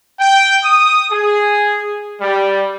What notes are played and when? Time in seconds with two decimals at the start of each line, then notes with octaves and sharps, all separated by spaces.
0.19 G5
0.64 D#6
1.11 G#4
2.21 G3